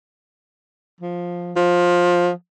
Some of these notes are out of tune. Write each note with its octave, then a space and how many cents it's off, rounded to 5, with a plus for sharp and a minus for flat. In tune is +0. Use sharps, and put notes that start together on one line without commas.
F3 +10
F3 +15